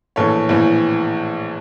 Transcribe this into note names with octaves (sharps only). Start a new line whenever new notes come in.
A#1 A2 E3 A4 C#5
A#1 A2 E3